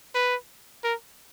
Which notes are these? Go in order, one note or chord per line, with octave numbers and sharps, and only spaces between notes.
B4
A#4